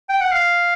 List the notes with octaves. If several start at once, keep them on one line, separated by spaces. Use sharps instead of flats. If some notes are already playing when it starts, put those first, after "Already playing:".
G5
F#5
F5